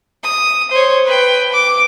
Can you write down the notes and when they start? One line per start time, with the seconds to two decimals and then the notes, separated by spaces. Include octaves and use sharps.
0.23 D#6
0.71 C5 C#5
1.05 B4 G5
1.53 D6